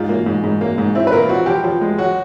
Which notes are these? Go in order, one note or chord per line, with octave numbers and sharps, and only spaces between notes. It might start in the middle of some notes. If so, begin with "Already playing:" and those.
Already playing: G#2 F4
A#3
G#2
G#2
A#3
G#2
C4 E4
B4
A#2 A#4
F4
C4 F#4
F3 G4
F3
G#3
F#3 F#4